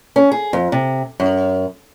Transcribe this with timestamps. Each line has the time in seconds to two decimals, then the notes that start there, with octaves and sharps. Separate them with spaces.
0.16 C#4
0.32 G#4
0.53 F2
0.72 C3
1.20 F#2